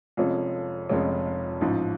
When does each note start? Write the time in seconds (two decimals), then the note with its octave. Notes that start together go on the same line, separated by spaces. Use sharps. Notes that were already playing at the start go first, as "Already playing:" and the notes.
0.17 F1 F2 F3 G#3 C#4
0.89 F1 F2 F3 G#3 C#4
1.61 A1 G#2 F3